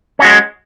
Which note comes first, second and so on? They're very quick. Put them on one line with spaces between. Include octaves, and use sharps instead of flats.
C#4 F#4 G#3